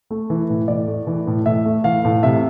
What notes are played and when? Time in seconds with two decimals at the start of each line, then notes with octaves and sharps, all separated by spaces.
0.10 A3
0.30 E3
0.50 A2
0.68 A2 D5
0.88 A3
1.07 E3
1.27 A2
1.46 A2 E5
1.66 A3
1.84 E3 F5
2.05 A2
2.23 C3 E5